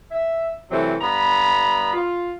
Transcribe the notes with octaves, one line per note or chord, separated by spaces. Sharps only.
E5
C3 E3 F#3 A3 C4
G2 B3 A#5 B5
F4